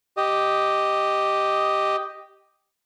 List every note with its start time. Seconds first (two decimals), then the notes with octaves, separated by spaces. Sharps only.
0.17 G4 D#5